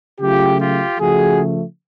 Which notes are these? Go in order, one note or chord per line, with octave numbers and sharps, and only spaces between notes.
C#3 F#3 A3 F4 G4
F4 G4
C#3 F3 A3 F#4 G#4